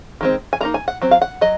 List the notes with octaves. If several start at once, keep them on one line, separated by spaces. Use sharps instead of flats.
D#3 G#3 C4
G#5
D#3 A#3 D#4 A#5
G#5
F#5
F#3 C4
F5
F#5
F#3 D#5